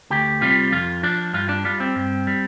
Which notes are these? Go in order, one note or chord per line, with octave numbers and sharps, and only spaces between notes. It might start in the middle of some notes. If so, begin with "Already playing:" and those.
D2 G4
C3 G3 F4
F2 F4
F3 D4
G2 F4
D4
G3 F4
C4
G2
G3